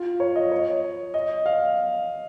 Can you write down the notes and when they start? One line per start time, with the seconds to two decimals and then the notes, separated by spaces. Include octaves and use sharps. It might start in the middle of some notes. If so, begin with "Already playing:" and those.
Already playing: F4
0.20 C#5
0.36 D#5
0.52 C#5
1.14 D#5
1.46 F5